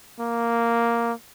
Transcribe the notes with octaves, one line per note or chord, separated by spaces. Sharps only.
A#3